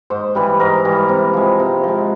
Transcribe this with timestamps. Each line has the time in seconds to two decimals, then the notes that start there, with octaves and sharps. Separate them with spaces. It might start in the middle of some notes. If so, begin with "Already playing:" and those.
0.10 G#2 C5
0.35 E3 G3 B4
0.60 G#2 A#4
0.85 E3 G3
1.09 C3
1.34 F3 G#3
1.60 C3
1.84 F3 G#3